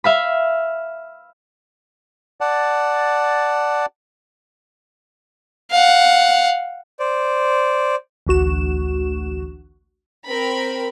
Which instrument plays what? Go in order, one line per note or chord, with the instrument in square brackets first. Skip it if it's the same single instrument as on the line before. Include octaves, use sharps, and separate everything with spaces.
[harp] E5 F5 B5
[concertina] D5 F#5 A5
[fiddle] F5 F#5
[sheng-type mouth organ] C5 D5
[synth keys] A1 D2 F#4 E7
[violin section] C4 A#4 B5